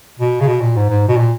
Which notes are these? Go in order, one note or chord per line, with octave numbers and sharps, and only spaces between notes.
B2
C#3
B2
A#2
G#2
G#2
B2
A#2